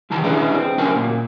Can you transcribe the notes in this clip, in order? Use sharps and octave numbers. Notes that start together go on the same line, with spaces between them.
C2 D#3 E3 A5 A#5
C#4 D4 E4 G#4 B4 D5
C4
D2 C#4 F#4 A#4 A5
A#2